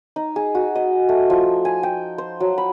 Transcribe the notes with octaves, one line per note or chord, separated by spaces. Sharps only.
D#4
G#4
F#4
D#5
A3
F3
G#5
G5
C5
F#3
B5